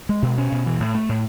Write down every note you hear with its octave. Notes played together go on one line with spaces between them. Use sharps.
G#3
B2
C#4
B2
E3
A2
A3
A2